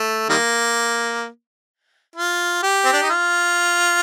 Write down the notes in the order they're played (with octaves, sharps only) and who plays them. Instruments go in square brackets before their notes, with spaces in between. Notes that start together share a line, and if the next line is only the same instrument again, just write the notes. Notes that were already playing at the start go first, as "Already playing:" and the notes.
Already playing: [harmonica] A3
D#3 G3 A#3
F4
G4
C4
D4
D#4
F4